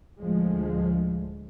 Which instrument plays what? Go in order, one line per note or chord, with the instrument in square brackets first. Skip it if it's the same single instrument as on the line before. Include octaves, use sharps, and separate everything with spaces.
[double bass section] D2 A2 F3 G#3